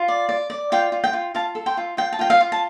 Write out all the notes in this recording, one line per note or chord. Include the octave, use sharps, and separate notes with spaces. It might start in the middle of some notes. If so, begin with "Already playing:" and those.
Already playing: F4
D5
D5
D5
F4 G5
F4
G5
F4
F4 F5 A5
A4
G5 C6
F4
F4 G5
A5
F4 G5
F5
F4
A5